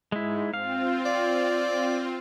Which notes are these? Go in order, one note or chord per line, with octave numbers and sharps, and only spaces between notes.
G#2 G#3 E4
C4 F4 F5
D5